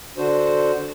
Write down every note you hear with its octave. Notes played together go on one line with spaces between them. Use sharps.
D3 D4 F#4 C5